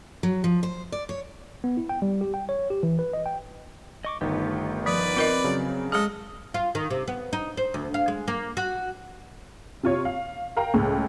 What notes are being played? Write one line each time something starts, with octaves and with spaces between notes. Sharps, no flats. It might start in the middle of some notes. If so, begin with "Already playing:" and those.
F#3
F3
C5
D5
C#5
B3
E4
G5
G3
G4
G5
C#5
G4
E3
B4
D#5
G5
D#5 C#6 D6
G1 D#3 A3 B3 G4
F3 B4 D5
C4 F4 A#4 D#5
C#3 F#3
G#3 G#4 A4 D#5
F4
D#3
C3
B3
D#4
C5
D2
F5
G#3
A#3
F#4
C3 F4 C#5
F5
A#4 F5 G5 A#5
C#2 A2